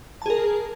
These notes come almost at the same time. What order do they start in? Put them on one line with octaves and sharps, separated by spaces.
A5 G#4 A#4